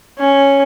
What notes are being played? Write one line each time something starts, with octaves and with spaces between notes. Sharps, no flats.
C#4